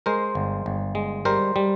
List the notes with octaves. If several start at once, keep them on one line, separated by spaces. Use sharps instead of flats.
G#3 A#4 C5
G1
G1
G#3
G3 A#4 C5
G3